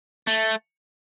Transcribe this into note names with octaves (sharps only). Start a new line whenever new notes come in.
A3